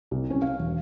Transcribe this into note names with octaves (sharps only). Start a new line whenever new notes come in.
C2
C#4
F5
E1